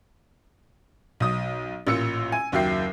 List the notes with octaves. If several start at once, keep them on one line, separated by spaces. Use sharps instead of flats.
B1 D#6
A1 A#2 E6 C#7
G#5
F#1 D#2 F#3 E5 G5 C7